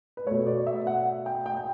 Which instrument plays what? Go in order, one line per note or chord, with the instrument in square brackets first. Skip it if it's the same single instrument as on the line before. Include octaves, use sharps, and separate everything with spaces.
[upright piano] B4
B2 A3 C#5
D5
E5
F#5
G5
G5
G5